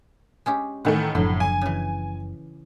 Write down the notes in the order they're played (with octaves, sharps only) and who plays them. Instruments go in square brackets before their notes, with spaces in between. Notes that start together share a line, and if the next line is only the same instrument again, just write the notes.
[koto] G#3 C#4 G4
[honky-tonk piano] A2 D#3 A3 [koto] E3 F#5
[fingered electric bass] F#1 F3 [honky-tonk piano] A2 [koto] D3 F#3
[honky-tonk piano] G#5
[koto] C#3 E3